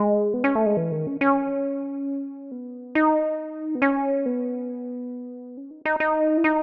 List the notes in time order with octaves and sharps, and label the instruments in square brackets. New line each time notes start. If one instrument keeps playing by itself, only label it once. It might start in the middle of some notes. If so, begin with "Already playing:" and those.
Already playing: [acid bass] G#3
B3
C#4
A3
G#3
E3
D#3
C#4
C#4
B3
D#4
B3
C#4
B3
C#4
D#4
D#4
D#4
E4
D#4